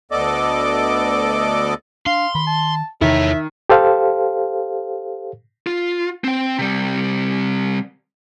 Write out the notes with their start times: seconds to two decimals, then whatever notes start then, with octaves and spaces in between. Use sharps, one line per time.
0.11 D2 B3 A4 D5 D#5 D6
2.06 D4 F5 C6
2.35 D#3 B5
2.47 A5
3.01 E2 C3 D#3 E4 C#5 E5
3.69 G4 A4 C5 F5
5.67 F4
6.24 C4 G5
6.59 C3 G3